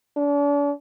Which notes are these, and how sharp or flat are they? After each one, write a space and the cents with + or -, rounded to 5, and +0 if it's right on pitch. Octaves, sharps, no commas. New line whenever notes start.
D4 -40